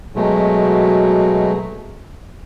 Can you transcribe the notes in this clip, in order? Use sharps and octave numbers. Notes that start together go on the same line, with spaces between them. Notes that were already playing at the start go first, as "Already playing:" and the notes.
B2 F#3 G#3 A3